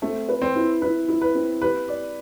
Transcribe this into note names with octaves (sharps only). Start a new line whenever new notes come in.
A3 C4
B4
C4
E4
E4 B4
E4
B4
C4
G4 B4
D5